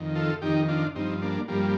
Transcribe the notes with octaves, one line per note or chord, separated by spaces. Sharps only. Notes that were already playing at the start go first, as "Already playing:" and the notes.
Already playing: F2 D#3
F4 A4
F2 D#3 D#4 G4
D4 F4
G2 F3 C4 D#4
A#3 D4
G2 F3 G3 A#3